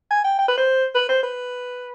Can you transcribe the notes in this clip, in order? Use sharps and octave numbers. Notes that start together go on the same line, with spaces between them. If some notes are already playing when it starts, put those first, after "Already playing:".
G#5
G5
G5
B4
C5
B4
C5
B4